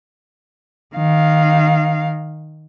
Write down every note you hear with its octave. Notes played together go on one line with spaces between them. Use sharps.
D#3 F5